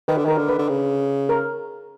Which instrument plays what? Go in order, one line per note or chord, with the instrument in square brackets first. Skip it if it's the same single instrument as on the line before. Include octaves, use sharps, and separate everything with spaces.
[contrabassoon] D#3 [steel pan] B4
[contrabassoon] D3
[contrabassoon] D#3 [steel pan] A#4
[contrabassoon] D3
[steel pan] B4
[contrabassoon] D3
C#3
[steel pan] A#4